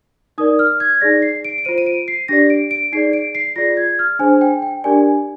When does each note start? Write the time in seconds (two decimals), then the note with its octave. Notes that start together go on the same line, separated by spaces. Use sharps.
0.38 D#4 A#4 D5 D#6
0.59 F6
0.80 G#6
1.01 D#4 G#4 D5 A#6
1.22 C7
1.45 D7
1.58 D7
1.65 F4 C5 D#7
1.78 D#7
1.86 D7
2.08 C7
2.28 D4 G4 D5 A#6
2.50 D7
2.71 D7
2.92 D#4 G#4 D5 C7
3.13 D7
3.35 C7
3.56 F4 G#4 D5 A#6
3.77 G#6
3.99 F6
4.19 D4 G#4 C5 G#5
4.41 G5
4.62 G5
4.84 D4 G4 A#4 D5 G#5